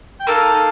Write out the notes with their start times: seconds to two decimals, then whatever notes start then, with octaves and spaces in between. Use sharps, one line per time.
0.20 G5
0.27 A#3 D#4 A4 F5